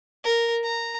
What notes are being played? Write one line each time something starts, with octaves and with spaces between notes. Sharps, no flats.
A#4
A#5